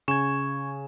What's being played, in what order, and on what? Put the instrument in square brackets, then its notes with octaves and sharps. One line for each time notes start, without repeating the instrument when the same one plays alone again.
[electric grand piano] C#3 G#5 E7 [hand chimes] C#6 G#6